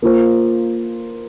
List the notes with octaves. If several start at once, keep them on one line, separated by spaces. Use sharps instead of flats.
A#3 F4 C5